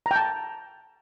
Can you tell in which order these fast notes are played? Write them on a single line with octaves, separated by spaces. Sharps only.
A#5 G5 A5